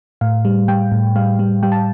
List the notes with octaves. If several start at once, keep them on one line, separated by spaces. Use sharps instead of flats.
A2 F5
G3
G3 G5
A2
G3 F5
G3
G3 G5
A5